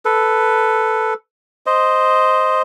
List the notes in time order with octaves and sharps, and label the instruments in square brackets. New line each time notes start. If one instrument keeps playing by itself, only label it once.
[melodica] A4 B4
C5 D#5